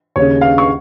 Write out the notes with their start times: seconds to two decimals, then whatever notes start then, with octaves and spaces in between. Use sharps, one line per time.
0.16 D#2 C#3 C#5
0.41 F5
0.58 C#6